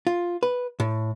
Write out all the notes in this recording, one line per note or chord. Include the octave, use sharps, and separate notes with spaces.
F4
B4
A2